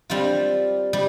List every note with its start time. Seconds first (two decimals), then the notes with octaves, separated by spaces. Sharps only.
0.10 G3 C4 F4
0.93 G3